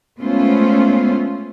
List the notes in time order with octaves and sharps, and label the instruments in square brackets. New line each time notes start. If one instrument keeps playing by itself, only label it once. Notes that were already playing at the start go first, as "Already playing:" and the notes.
[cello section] G#3 A3 B3 C#4 F4 C5